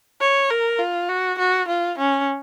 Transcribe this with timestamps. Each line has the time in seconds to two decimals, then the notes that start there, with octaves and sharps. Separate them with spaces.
0.21 C#5
0.50 A#4
0.79 F4
1.09 F#4
1.39 F#4
1.68 F4
1.98 C#4